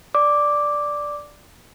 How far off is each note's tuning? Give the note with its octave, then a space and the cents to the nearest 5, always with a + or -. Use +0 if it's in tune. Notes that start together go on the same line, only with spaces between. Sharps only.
D5 +0 D6 +0